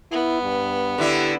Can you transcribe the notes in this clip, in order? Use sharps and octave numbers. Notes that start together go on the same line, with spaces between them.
B3 E4
G2
D3 D4 E4 G4